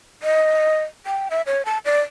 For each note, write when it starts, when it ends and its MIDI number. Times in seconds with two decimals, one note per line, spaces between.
0.23 0.83 75
1.06 1.28 79
1.31 1.42 76
1.47 1.65 73
1.65 1.78 81
1.85 2.01 74